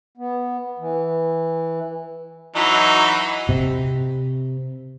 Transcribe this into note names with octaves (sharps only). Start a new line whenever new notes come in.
B3
E3
E3 F#3 D#4
C3